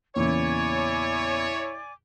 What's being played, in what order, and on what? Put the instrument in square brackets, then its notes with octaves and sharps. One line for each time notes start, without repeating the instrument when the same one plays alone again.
[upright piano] E2 A#2 C#3 [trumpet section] E4 C#5 [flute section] D5 G#5 D6